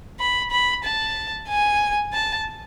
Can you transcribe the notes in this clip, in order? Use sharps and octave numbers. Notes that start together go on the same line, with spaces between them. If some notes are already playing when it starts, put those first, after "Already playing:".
B5
B5
A5
G#5
A5